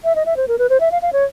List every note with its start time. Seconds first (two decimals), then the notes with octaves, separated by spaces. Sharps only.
0.04 E5
0.16 D#5
0.26 E5
0.37 C5
0.48 A#4
0.59 B4
0.70 C5
0.80 E5
0.92 F5
1.02 F5
1.13 C#5